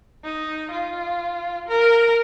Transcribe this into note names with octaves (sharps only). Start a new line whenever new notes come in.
D#4
F4
A#4